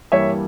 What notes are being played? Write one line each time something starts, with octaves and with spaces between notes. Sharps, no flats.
G2 E3 G3 A#3 C#5 E5